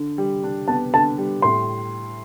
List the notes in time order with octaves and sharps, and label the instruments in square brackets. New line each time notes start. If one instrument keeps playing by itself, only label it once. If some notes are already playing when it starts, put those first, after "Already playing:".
Already playing: [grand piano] D3
G3
D4
[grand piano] B3 [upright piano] A5
[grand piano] D3 [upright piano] A5
[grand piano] G3
[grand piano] A2 [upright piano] C6